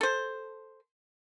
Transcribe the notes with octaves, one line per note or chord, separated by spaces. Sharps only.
A4 C5